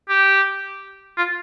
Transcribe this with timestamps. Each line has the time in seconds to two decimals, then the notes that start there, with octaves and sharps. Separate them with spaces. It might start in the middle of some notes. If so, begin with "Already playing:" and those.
0.09 G4
1.17 F4